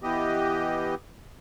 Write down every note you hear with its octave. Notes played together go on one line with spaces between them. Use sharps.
E3 B3 G4 D#5